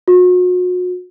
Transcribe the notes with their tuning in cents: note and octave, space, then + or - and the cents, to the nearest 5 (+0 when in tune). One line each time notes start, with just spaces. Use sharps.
F#4 -40